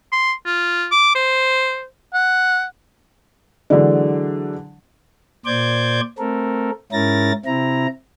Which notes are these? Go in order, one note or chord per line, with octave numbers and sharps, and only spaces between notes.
C6
F4
D6
C5
F#5
D3 E3 F#3 G#3 D4
A#2 C5 D5 D6 G6 G#6
A3 C4 A4 A#4
G#2 C#4 E4 A#4 A6 A#6
C3 C4 E4 A#5